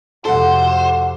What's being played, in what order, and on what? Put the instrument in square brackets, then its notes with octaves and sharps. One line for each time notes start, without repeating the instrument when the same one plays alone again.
[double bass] F2 C3 [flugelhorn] F#4 [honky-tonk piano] A4 F#5 [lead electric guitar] C5